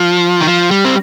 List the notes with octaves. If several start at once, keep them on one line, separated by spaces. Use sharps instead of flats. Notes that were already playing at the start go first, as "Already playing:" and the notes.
Already playing: F3
D#3
F3
G3
C4